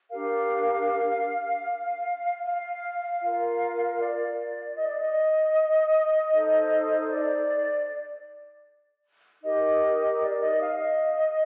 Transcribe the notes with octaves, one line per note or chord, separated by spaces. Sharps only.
D4 G4 A#4 F5
F5
F4 A#4 F5
D5
D#5
D5
D#5
D#4 A4 C5
D#5
D5
D#4 G4 A#4 D#5
D5
D#5
F5
D#5